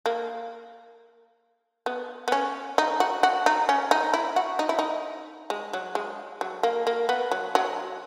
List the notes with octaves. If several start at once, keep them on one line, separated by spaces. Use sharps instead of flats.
A#3
B3
B3
C#4
D#4
F#4
F#4
D#4
C#4
D#4
E4
F#4
D#4
E4
D#4
G#3
F#3
G#3
F#3
A#3
A#3
B3
F#3
F#3